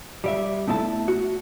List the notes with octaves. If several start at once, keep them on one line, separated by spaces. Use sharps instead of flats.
G3 D5 E5
A3 B3 E4 E5 A5
F#4